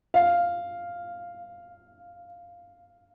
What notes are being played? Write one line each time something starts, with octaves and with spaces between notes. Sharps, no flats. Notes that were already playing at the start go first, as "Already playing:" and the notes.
F5